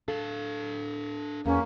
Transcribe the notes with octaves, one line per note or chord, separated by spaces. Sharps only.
D4 A4 F5
E2 A#3 C#4